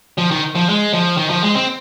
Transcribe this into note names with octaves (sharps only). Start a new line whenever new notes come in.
F3
D#3
F3
G#3
F3
D#3
F3
G#3
C4